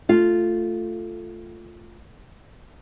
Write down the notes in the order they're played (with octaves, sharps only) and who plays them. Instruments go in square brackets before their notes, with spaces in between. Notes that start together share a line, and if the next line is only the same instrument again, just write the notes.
[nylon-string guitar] A3 F4